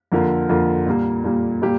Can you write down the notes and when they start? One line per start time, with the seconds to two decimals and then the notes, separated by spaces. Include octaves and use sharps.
0.12 F2 D3 A#3 F4 A#4
0.49 F2 D3 A#3 F4 A#4
0.86 A#2 G3 A#3
1.24 A#2 G3 A#3
1.62 A#2 G3 A#3 G4